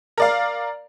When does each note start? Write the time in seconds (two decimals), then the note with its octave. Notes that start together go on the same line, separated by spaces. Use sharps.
0.18 A#4 D5 F5